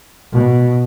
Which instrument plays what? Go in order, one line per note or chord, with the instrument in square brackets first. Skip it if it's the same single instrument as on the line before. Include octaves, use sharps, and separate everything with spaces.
[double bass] B2